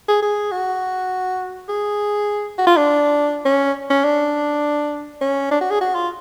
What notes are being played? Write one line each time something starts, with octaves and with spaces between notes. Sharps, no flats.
G#4
G#4
F#4
G#4
F#4
F4
D4
C#4
C#4
D4
C#4
D4
F#4
G#4
F#4
F4